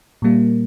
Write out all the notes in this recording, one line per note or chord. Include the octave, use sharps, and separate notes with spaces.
A#2 G3 A#3